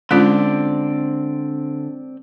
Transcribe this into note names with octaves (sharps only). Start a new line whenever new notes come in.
D3 G#3 C4 C#4 F4 D5